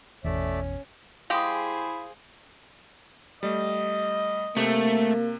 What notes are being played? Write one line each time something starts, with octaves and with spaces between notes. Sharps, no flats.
G#1 E2 B2 A3 C#4 D5 E5
G#3 E4 G4 G#4 C5 F5 D#6
G3 A3 D#5
C3 A3 A#3